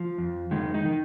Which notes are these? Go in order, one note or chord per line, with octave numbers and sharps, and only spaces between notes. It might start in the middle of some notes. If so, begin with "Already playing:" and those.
Already playing: F3
F2
D#3 G#3
D#4
D#3